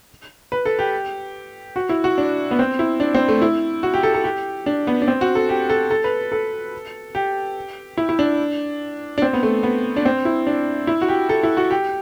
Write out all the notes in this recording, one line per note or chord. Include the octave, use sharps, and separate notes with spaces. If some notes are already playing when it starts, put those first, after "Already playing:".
B4
A4
G4
F#4
E4
F#4
D4
B3
C4
E4
D4
C4
A3
E4
F#4
G4
A4
A4
G4
D4
B3
D4
C4
F#4
A4
G4
A4
A4
B4
A4
G4
E4
E4
D4
D4
C4
B3
A3
B3
D4
C4
E4
D4
E4
F#4
G4
A4
E4
F#4
G4